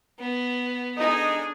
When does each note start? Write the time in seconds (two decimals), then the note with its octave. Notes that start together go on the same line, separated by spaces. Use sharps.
0.19 B3
0.97 D4 D#4 G#4 A4 D#5